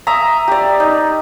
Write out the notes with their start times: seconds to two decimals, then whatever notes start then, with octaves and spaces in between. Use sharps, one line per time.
0.07 E5 A#5 D#6
0.48 G4 D5
0.80 D#4